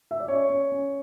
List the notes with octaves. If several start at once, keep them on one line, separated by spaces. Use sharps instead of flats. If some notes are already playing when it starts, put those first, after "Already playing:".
E5
D5
C#4 C#5
C#4
C#4